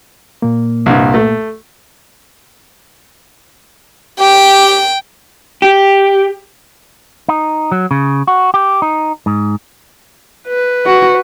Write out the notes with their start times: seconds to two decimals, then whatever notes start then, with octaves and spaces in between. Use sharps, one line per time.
0.42 A#2 A#3
0.86 C2 G2
1.14 A3
4.20 G4 G5
5.62 G4
7.28 D#4
7.72 F#3
7.91 C#3
8.27 F#4
8.54 G4
8.82 D#4
9.26 G#2
10.48 B4
10.86 F#4